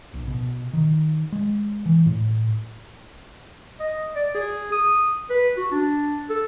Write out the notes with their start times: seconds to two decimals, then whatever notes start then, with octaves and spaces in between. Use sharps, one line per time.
0.14 A#1
0.27 B2
0.73 D#3
1.32 G#3
1.86 E3
2.06 A2
3.80 D#5
4.16 D5
4.34 G#4
4.72 D#6
5.30 B4
5.57 F#4
5.71 D4
6.30 A4